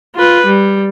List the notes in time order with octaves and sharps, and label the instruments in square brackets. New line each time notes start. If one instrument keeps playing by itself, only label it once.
[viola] F4 B4
G3